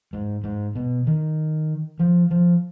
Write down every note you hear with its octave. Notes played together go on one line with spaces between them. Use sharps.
G#2
G#2
B2
D#3
F3
F3